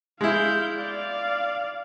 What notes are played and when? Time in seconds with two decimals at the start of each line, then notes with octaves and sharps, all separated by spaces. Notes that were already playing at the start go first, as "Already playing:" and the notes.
0.21 G#3 E4 F5 G6
0.77 D5 F5